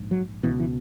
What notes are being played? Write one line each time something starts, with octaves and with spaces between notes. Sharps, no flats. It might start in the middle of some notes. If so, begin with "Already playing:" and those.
Already playing: A#1 G#2
F#3
C#2 B2 E3
E3